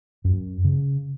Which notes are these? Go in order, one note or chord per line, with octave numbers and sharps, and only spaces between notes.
F#2
C#3